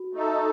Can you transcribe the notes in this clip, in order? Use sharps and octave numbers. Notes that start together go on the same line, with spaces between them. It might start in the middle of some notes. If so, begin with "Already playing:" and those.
Already playing: F#4
A3 D#4 A4